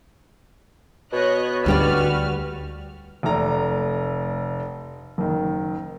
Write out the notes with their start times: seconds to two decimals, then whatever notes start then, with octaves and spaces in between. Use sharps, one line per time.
1.13 B2 C#5 D#5 F#6
1.66 D2 G3 F#4 G4 B4 D5 F6
3.23 F1 A3 D5 A#5
5.18 F#1 D#3